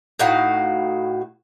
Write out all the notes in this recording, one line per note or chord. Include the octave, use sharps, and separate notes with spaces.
A2 D#4 F#4 F5